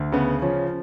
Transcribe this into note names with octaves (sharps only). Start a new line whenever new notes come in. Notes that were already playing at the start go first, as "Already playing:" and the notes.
Already playing: D2
C#3 B3
F3 C#4